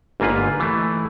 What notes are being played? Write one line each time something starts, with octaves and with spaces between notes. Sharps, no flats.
G1 G#2 A#3 F4 B4
E3 A3